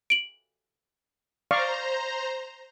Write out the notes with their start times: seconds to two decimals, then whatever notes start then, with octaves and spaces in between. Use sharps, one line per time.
0.10 D7 F#7
1.51 C5 D5 F5 A#5 C#6